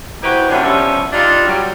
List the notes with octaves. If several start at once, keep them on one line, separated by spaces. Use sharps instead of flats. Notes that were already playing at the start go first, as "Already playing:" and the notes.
D#4 E4 F#4 G4 B4 C5
F#2 C3 E3 B3 C#4 D4
G2 F3 G3 B3 C#4 E5
G3 D4 D#4 F4
F#3 G3